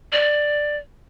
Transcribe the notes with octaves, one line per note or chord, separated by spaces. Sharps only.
D5